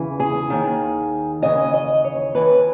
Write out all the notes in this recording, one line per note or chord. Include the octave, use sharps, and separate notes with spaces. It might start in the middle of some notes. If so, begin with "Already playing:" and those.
Already playing: E2 C#3 E3
G#4
D#2 D#3
D#2 C#3 E3 D#5
D#5
C#5
D#2 C#3 E3 B4